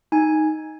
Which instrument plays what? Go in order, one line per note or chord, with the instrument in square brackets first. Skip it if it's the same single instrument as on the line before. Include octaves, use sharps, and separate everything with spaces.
[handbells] D#4 G#5